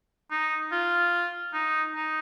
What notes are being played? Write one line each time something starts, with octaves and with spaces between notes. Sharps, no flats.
D#4
F4
D#4
D#4